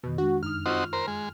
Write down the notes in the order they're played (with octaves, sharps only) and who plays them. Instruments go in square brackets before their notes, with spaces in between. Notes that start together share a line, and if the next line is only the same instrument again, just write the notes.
[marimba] F2 D#3 [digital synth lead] B2
[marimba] G#3 D4 [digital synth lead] F#4
[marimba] F#2 D#4 D#6 [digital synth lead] F6
[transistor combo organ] C4 D#4 F#4 [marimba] F4 C#6
[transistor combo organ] A#4 C5
G#3